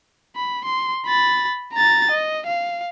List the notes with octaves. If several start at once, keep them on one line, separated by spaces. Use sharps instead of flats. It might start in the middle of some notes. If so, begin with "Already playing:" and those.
B5
C6
B5 A6
A#5 A6
D#5
F5